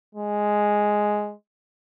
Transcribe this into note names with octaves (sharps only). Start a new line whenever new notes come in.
G#3